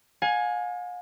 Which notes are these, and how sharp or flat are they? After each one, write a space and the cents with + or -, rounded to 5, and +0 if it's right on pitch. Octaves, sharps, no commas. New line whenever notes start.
F5 +45 G#5 +5